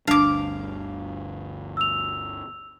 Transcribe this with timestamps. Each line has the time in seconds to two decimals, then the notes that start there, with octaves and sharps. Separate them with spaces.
0.07 G1 D2 G3 D4 F5 D6
1.77 E6 F7